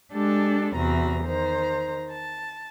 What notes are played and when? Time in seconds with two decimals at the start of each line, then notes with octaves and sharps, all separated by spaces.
0.13 G#3 D4 G4 A4
0.75 E2 C3 F#4 A#5
1.23 D#3 C5 A#5
2.12 A5